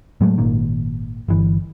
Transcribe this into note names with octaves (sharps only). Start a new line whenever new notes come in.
A2 F#3 G#3 A3
G#1 A#2 D#3
G1 E3